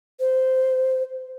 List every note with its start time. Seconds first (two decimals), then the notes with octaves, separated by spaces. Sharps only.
0.20 C5